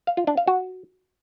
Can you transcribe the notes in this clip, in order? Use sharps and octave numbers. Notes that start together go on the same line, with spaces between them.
F5
F4
D4
F5
F#4